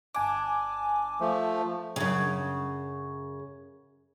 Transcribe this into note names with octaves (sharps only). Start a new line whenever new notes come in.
G1 D4 G#5 D6
F3 A3
F#2 C#3